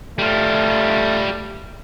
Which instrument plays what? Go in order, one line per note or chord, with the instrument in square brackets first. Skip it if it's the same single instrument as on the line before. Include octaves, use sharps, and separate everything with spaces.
[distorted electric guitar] G3 F4 [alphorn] A3